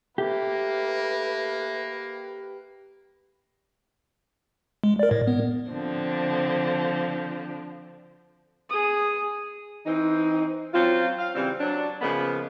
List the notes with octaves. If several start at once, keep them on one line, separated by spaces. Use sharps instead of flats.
A3 A#3 G4 B4
G#3
A#4 D5
A2
B3
D3 F3 C4 D4
G#4 D#6
E3 C4 D#4
F#3 C4 C#4 F4
F5
C#3 E3 G3 C4
F#3 D4
C#3 F3 G#3 A#3 B3 B4